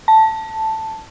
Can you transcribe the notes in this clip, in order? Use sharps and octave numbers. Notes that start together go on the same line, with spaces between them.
A5